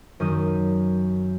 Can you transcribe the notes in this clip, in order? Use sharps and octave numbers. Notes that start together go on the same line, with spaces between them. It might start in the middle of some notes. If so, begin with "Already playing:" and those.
F#2 D#3 D#6